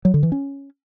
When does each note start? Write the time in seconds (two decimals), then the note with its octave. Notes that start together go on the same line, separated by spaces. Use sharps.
0.05 F#3
0.14 D3
0.23 E3
0.32 C#4